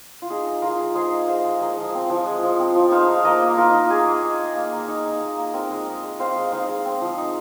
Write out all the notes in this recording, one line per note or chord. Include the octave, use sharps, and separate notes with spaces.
F4
D#4 G#4
D#4
G#3 F4 A#4
G#3
D#4 G#4 C5
D#4
G#3 C5 F5
G#3
G#3 A#4 D#5
F3
C4
F3
G#3
F3
C4
F3
D#4 C5 F5
D#4
F5
A#3 A#4 D#5
A#3
D#4 F4 A#4
D#4
A#3 G#4
A#3
D#4
D#4
A#3
A#3
D#4
D#4
A#3
A#3
C4 A#4 D#5
G#3
D#4
G#3
C4 C5 F5
G#3
D#4 C5 F5
G#3
C4
F3
D#4